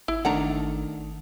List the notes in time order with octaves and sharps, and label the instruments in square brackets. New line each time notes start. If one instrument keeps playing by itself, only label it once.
[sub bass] G#1 [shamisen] E4
[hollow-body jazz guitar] D#3 A3 D4 [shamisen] F#5 A#5